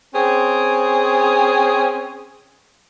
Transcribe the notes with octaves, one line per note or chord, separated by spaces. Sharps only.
C4 C#4 G#4